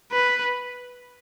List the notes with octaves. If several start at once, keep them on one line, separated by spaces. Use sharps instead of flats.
B4